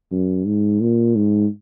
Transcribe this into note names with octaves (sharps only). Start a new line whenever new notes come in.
F#2
G#2
A#2
G#2